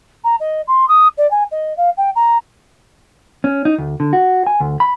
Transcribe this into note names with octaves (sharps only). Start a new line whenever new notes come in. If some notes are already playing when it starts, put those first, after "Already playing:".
A#5
D#5
C6
D#6
D5
G#5
D#5
F5
G5
A#5
C#4
D#4
D2
D3
F#4
G#5
D2
B5